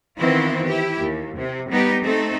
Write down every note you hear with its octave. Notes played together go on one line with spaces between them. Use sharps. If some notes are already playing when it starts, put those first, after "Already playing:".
D#3 E3 B3 C4 E4 F4
E4 G4
D#2
C3
G3 B3 D#4 G4
A3 C4 D#4 A4